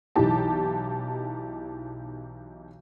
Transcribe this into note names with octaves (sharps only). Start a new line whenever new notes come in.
B1 E3 D#4 G4 A5